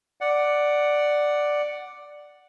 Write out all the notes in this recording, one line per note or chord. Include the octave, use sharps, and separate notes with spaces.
D5 F#5